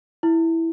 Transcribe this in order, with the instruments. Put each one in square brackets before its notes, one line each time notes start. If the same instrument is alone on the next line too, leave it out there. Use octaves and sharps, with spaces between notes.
[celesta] E4